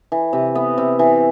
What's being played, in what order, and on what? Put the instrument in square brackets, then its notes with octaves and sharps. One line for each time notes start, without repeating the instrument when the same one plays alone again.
[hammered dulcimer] E3
C3
B3
C3
E3